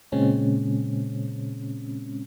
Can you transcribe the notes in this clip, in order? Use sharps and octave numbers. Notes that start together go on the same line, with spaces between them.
A#2 C#3 G#3 C4 C#4